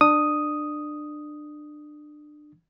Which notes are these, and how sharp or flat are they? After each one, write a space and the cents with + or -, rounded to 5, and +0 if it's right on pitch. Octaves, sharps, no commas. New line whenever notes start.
D4 +25 D#6 +0